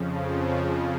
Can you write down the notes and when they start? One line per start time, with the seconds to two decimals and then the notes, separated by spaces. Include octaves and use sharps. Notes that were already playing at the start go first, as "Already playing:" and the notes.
Already playing: F2 C#3 F3